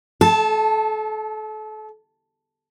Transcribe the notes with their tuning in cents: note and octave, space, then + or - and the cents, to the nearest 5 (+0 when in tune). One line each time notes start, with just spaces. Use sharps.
A4 -30 A5 +0